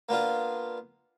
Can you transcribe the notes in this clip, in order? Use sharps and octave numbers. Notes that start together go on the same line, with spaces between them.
A#3 B3 D4 F4